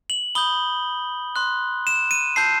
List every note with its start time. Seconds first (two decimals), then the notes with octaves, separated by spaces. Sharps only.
0.10 F#7
0.35 B5 D#6 G6 G7
1.36 C6 F#6
1.87 E7
2.11 D#7
2.36 A5 E6 G6 C7